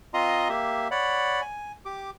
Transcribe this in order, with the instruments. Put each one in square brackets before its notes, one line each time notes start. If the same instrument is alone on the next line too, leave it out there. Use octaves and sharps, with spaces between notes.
[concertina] C4 F4 D#5 A#5 C6 D#6
A#3 G4 E5
C#5 D5 F#5 B5
G#5
G4 D6